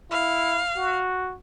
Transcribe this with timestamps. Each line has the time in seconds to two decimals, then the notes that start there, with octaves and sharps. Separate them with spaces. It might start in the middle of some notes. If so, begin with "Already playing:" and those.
0.11 E4 F5
0.77 F#4